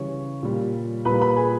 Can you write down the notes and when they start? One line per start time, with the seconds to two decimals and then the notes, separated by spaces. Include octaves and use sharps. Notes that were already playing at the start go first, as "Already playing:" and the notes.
Already playing: C#3 E3 G3 C#5 C#6
0.43 A#2 G3
1.05 A#2 G3 B4 B5
1.21 B4 B5
1.36 G#4 G#5